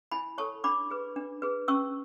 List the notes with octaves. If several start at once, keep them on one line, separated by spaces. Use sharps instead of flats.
E4 G#5 B5
A4 C#5 A5 C#6
D4 B5 D6
G#4 B4
D4
G#4 B4
C#4 C#6 E6